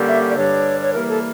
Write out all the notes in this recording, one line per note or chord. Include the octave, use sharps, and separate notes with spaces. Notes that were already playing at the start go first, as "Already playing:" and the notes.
Already playing: D3 G3 A#3 C#4 G4
E5
D5
G2 D3 G3 D4 C#5
C#5
E3 G3 A#3 A#4
A4